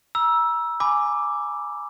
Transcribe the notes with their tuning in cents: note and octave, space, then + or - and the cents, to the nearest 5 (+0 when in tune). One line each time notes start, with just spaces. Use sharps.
A#5 +40 E6 +0
G#5 +0 B5 +5 D6 +0